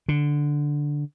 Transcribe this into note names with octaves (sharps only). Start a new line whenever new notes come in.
D3